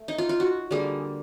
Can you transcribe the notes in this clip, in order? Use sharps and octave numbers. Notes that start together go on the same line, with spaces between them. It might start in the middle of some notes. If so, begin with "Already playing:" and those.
Already playing: A3
D#4
F4
F4
F#4
D3 G3 A#3 G#4